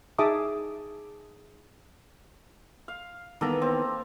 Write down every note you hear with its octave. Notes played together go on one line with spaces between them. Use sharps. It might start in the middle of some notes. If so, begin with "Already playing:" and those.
D#4 G#4 E5 A5 D6 D#6
F5
D#3 E3 A#3 B3 A4 A#5
C4